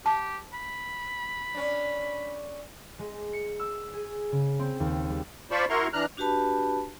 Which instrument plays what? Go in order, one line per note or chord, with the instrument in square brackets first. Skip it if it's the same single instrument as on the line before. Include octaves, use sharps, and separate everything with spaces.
[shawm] G4 [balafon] A5
[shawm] B5
[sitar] C#4 D4
[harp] G#3
C#7
E6
G#4
C#3
C4
D#2
G3
[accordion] F4 C5 D5 A5 B5 C#6
E4 F#4 A#4 A#5 C6 C#6
E3 D4 A#5 F6 F#6
[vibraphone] D4 F#4 G4 B4 A5 B5